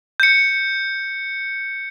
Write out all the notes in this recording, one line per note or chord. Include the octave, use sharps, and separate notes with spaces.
G6 C#7